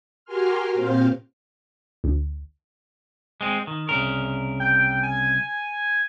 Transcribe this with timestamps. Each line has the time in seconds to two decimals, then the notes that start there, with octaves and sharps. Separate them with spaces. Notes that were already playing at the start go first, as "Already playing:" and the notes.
0.25 F#4 G4 A#4 G#5 C6 F6
0.74 A#2 C4 C5 F5
2.04 D2
3.41 G#3 C4
3.67 D#3
3.89 C2 C#3 A#4
4.60 G5
5.03 G#5